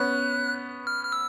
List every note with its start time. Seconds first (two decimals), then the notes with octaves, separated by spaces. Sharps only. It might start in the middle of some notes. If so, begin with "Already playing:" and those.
Already playing: B3 C#4 F#6
0.87 F6
1.05 F6
1.12 E6